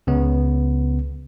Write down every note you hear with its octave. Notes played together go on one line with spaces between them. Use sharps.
C#2 C#3 B3